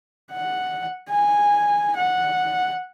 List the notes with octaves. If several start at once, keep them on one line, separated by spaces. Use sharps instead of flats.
F#5
G#5
F#5